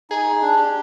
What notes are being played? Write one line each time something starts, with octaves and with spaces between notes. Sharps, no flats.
D#4 G#4
D4
G4